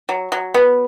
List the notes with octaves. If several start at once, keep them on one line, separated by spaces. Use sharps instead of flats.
F#3
F#3
B3